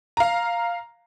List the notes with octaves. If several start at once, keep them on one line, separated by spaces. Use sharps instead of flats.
F5 A#5